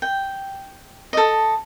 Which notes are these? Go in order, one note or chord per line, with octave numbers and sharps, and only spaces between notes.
G5
A4 D#5